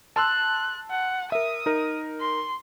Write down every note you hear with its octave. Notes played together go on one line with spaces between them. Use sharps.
A5 C6 E6 F#6
F#5
A#4 E5 D#6
D#4 A#4
C6